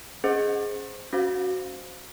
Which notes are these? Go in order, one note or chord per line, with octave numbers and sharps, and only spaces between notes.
C#4 G#4 C5 D#5 F#5
C#4 F#4 C5 F5